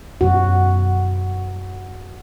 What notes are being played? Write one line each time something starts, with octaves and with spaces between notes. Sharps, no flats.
F#2 B2 F#4